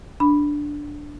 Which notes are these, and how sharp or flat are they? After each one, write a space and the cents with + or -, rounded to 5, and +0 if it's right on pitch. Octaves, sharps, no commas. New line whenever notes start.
D4 +0 B5 +0